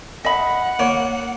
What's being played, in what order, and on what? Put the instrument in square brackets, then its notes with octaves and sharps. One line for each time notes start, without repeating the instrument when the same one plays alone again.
[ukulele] D#5 E5 B5 [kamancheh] F#5
[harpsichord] A#3 [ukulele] C#5